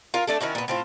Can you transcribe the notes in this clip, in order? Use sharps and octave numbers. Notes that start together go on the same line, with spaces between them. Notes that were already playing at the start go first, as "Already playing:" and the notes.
F4 A#4
A3 D4 A4
D#3 C#4 E4 F#4
A#2 B3
A2 C4 F4